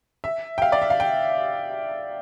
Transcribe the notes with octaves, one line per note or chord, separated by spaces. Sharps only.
E5
G5
F5
D5
E5
F5
G5